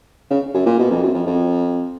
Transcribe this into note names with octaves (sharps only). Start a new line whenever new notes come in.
C#3
F#2
A#2
B2
F2
F#2
F2
F2